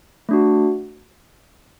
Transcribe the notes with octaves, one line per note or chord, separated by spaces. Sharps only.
A3 D4 F#4